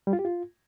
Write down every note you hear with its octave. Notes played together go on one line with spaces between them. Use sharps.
G3
F4
G4
F4